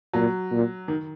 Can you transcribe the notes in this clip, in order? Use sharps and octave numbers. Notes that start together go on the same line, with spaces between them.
A#2 F#3
A#2
D#3